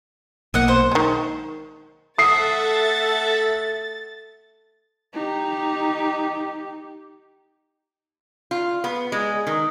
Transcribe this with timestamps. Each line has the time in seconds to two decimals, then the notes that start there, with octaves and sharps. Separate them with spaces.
0.54 B1 A#3 D#5 F#5
0.68 C5
0.92 D#3 G#3
2.18 A3 A4 E5 F#5 D#6 A6 C7
5.14 D#4 G4
8.51 F4
8.84 B3
9.12 G#3
9.47 D#3